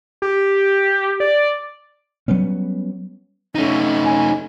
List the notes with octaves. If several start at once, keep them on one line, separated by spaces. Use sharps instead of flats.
G4
D5
F#3 G3 B3 C#4
A3 C#4 D#4
G#5